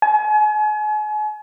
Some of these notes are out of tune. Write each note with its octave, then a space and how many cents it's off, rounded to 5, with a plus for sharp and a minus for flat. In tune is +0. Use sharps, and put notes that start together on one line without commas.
G#5 +40